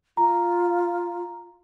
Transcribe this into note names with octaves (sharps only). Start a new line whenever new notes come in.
F4 A#5